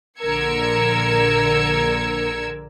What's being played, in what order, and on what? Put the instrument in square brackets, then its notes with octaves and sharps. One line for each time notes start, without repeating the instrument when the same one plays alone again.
[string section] A#1 D3 A#4 E6 G#6 C#7